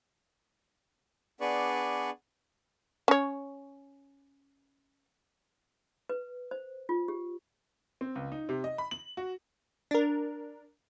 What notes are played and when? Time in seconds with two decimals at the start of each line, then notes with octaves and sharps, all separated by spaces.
1.41 B3 D4 G#4 B4 D5 C#6
3.08 C#4 C#5
6.09 B4
6.51 C5
6.89 F4
7.08 G4
8.01 C4
8.16 C#2
8.32 D#4
8.49 C3
8.64 D#5
8.78 B5
8.91 F#7
9.17 F#4
9.91 D4 A#4